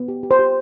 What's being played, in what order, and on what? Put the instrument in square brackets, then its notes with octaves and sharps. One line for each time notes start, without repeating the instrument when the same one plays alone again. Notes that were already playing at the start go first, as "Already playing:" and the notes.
Already playing: [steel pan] B3
G4
G4
C5
G4